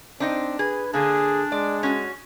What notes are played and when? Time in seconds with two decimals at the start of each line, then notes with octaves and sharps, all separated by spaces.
0.20 C4 D4 D#4 D#5
0.59 G#4 B4
0.93 D3 A#3 D4 G#4
1.52 G#3 D5
1.83 C#4 F#4